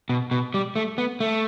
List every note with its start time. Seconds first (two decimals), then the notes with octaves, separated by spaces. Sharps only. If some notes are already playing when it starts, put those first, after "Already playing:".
0.09 B2
0.31 B2
0.54 G3
0.76 A3
0.98 B3
1.20 A3